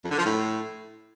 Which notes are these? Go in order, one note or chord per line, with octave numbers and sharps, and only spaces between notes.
F2
D3
F3
A2